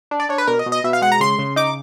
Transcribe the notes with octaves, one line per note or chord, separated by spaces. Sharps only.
D4
D5
D4 C#5
B4
B2 A#4
D#5
B2
D#5
B2 E5
F5
G#3 F#5
A#5
C#3 C6
C#3
D#4 D6